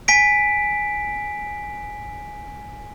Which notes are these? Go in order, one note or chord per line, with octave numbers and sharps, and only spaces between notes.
G#5 B6 D7